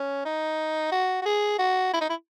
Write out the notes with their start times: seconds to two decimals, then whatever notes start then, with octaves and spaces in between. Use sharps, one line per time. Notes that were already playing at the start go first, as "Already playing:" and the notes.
Already playing: C#4
0.25 D#4
0.92 F#4
1.22 F#4
1.26 G#4
1.59 F#4
1.94 E4
2.01 D#4
2.10 E4